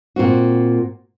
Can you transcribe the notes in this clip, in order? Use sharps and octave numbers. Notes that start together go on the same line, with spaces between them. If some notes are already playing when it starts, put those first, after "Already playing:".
A#2 C4 F#4